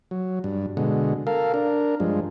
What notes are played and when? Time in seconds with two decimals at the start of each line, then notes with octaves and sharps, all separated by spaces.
0.11 F#3
0.44 G2
0.77 B2 D3 G#3
1.27 A4 A#4 F5
1.54 D4 A#4
2.00 G2 F3 G#3